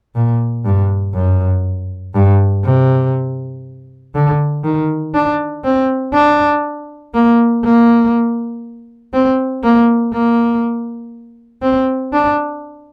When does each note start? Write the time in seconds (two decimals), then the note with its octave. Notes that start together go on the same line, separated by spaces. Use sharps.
0.15 A#2
0.65 G2
1.15 F#2
2.15 G2
2.65 C3
4.15 D3
4.64 D#3
5.14 D4
5.64 C4
6.14 D4
7.14 A#3
7.64 A#3
9.13 C4
9.63 A#3
10.13 A#3
11.62 C4
12.13 D4